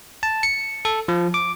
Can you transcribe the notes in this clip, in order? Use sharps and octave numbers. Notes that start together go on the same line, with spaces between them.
A5
C#7
A4
F3
D6